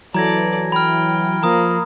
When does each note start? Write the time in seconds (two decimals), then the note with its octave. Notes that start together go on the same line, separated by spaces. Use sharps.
0.14 E3 F#3 A4 D5 A#5 G#6 A#6
0.72 G5 B5 F6
1.43 F3 A#3 A#5 D#6